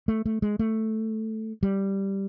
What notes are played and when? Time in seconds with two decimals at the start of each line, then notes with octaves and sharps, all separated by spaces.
0.08 A3
0.26 A3
0.42 G#3
0.59 A3
1.63 G3